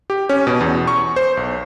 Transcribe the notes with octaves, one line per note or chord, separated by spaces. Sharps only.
G4
C#4
B2
E2
C#6
C5
B1